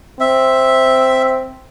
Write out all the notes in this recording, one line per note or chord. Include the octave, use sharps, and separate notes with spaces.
C4 E5